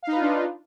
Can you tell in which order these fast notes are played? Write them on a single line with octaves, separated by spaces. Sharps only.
F5 D#4 B4 F4 D4